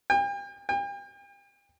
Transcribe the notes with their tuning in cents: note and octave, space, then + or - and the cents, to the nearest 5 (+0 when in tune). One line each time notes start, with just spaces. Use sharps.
G5 +40
G5 +40